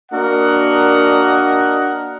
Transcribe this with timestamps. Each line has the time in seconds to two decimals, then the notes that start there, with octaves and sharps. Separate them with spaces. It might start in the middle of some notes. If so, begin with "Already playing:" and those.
0.12 A#3 D4 F#4 A#4 D#5 F#5